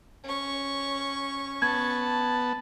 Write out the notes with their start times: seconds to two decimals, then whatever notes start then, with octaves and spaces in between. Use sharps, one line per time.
0.24 C#4 C#6
1.62 B3 A5 G#6